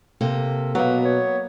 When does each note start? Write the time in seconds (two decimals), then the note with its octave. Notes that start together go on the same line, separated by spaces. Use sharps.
0.21 C3 A#3 A4
0.75 B2 F#3 A#3 B3 B4
1.05 C#5